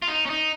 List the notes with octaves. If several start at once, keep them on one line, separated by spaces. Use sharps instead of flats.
F4
D#4
C#4
D#4